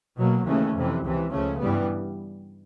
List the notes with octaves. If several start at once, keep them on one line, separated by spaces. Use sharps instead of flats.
B2 F#3 A#3
D#2 C#3 E3 A3 C#4
F2 C3 E3
C#2 C3 E3
C#2 C#3 F3 A3 C#4
G2 E3 G3 B3